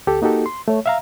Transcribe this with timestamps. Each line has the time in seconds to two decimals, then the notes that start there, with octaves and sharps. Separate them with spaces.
0.07 D2 G4 A4
0.22 A#3 D#4 F#4 G4 A4
0.46 C6
0.68 A3 C#5
0.86 E5 F5 A#5